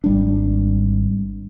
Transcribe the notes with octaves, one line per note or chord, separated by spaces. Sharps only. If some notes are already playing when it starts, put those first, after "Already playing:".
G#1 G3 D4